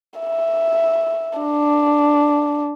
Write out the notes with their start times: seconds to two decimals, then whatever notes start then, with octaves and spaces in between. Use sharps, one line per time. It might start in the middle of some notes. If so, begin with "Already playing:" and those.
0.20 E5
1.39 D4